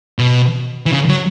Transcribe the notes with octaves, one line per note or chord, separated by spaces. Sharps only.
B2
E3
C#3
F#3